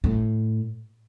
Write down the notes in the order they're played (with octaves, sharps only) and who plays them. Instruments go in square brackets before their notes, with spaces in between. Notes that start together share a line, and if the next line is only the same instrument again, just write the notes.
[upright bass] A2